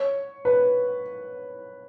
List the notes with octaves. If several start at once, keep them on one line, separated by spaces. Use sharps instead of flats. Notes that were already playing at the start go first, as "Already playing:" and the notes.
Already playing: C#5
B4